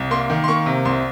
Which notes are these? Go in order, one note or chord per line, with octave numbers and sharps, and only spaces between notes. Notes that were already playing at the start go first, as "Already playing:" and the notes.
Already playing: C2
A#3 C6
D#3
C6
A#3 C#6
C3
C2 C6